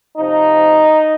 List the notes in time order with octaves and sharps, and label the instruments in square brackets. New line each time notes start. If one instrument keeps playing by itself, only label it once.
[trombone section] C3 F3 D#4